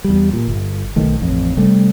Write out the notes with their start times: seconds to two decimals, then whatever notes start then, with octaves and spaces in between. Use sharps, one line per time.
0.04 E2 G3
0.33 A#2
0.48 G1
0.96 B1 D#3 A3
1.22 A1 F2
1.57 C3 G3 A3